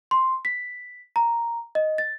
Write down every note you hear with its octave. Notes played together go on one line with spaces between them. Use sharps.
C6
B6
A#5
D#5
A6